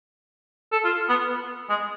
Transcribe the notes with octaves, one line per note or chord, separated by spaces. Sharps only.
A4
F4
B3
G#3